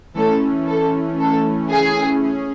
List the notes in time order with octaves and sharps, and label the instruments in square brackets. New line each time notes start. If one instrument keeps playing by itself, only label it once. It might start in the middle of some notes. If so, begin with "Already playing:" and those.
[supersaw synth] E3 A3 C#4 [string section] A4
[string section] A4
A4
G#4
[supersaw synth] C#4 G#4